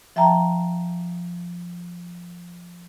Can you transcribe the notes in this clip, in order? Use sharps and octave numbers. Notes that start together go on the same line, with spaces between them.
F3 E5 G5 A5 A#5